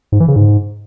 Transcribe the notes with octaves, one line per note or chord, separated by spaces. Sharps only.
G#2
E3
C#3
G#2